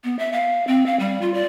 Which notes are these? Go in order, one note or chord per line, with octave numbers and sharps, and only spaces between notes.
B3
E5
F5
C4
F5
G3
F4
D5